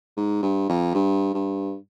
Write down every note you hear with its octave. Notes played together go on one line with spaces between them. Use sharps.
G#2
G2
F2
G2
G2